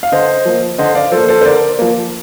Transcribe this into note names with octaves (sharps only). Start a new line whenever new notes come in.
F5
D3 C5 D#5
F3 A#3
D3 C5 D#5
D5 F5
F3 A#3 A4 C5
A4 C5
C5
D3 A#4 D5
F3 A#3